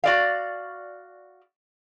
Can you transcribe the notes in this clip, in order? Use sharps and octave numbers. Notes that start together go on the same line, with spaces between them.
F#4 D5 F5